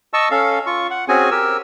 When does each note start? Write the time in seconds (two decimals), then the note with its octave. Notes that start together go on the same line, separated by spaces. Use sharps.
0.14 D#5 A5 C#6 E6
0.31 C#4 A4 F5
0.66 F4 C#6
0.91 F#5
1.08 C4 C#4 F#4 G#4 G#5
1.31 G4 A#4 E6